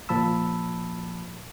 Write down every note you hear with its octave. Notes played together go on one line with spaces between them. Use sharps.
A#2 F3 A5 B5 E6